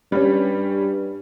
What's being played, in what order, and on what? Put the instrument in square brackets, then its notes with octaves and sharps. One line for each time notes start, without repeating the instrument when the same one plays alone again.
[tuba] G2 [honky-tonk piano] G3 C#4